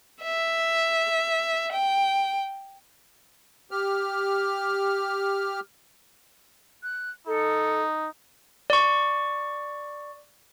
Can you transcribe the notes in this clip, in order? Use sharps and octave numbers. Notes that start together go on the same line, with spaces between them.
E5
G5
G4 F6
F#6
D#4 A4
D5 C#6